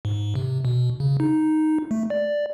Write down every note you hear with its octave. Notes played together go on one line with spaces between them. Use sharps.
G#2
C3
B2
C#3
D#4
A3
D5